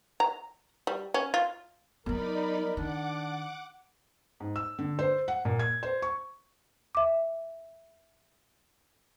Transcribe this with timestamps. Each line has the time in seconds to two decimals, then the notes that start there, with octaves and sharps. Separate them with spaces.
0.20 A#5
0.87 G3
1.14 C#4
1.34 F4
2.06 F#3 B3 D#4 A#4 D5 B5
2.77 D#3 D4 F#5 D6
4.40 G#2
4.56 E6
4.79 D3
4.99 C5
5.28 F#5
5.45 A#2
5.59 G#6
5.83 C5
6.02 C#6
6.95 E5 D6